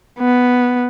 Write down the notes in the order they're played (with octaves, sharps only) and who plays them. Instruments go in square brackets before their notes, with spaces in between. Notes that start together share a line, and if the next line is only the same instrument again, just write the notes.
[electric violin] B3